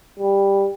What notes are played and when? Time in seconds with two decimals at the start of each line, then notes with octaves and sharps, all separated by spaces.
0.20 G3